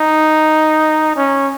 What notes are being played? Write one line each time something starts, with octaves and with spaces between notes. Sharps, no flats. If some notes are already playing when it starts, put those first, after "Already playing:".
Already playing: D#4
C#4